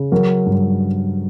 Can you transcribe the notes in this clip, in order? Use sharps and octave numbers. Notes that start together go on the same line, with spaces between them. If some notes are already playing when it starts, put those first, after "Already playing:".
Already playing: C#3
F#3 A#4
G2